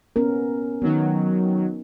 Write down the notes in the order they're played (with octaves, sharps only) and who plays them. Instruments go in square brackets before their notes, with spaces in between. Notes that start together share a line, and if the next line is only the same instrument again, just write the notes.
[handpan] B3 C#4 A#4
[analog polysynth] D#3 F#3 [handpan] B3 D#4